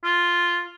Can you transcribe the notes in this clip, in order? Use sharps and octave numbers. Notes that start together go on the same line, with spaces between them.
F4